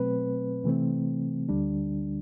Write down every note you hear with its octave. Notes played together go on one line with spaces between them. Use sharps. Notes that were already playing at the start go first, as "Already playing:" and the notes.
Already playing: B2 F#3 A3 C4 B4
C3 E3 A3 C4
D2 D3 G3 D4